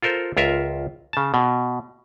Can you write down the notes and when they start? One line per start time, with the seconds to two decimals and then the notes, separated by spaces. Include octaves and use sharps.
0.03 F4 A4 A#4 C5
0.37 C#2 F4 A#4 E5
1.13 C#3 A5
1.34 B2